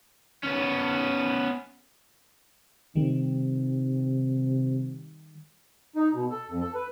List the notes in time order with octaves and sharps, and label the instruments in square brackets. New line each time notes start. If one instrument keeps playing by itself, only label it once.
[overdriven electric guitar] B3 C#4
[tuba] C3 [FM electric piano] D#3 G3
[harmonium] D#4
B2
A4
F2
A4
B4